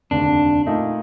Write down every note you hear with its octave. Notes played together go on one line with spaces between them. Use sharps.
F1 D#2 D3 D4
A#2 A3 D#4